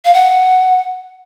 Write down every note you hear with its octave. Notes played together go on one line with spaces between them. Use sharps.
F5
F#5